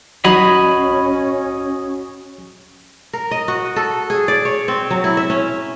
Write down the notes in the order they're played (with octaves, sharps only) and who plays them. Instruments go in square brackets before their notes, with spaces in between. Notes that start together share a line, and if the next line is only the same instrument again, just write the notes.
[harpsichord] F#3 D#4 [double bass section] C#4 [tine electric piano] F#4 G#6 [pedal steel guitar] D#5 B5
[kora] A#4
D#5
F#4
A4
G#4
D5
C#5
C4
F#3
E4
E5
C#4